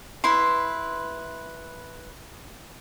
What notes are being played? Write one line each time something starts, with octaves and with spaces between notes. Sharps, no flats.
E4 B4 C6